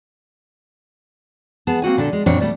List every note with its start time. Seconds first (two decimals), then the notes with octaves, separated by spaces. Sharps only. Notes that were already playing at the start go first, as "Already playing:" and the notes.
1.67 B3 G#4 A5
1.82 A#3 C4 F#4 G#5
1.97 A#2 D3 D4 A4
2.13 G#3
2.26 F#2 A#2 G3 C4 D4 C#5
2.40 B2 G3 A3 D5